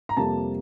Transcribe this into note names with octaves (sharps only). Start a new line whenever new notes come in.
A#5
F2 C3 G3 A#3 A5